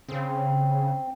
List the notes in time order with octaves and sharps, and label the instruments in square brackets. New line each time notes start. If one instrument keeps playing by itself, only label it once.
[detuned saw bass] C#3 [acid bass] C4